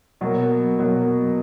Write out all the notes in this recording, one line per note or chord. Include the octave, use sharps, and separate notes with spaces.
B2 F#3 A#3
B2 F#3 A#3